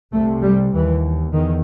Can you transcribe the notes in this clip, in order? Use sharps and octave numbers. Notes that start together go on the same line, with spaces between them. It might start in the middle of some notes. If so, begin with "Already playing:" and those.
C2 C3 A3
G3
D#2 E3
E2 D#3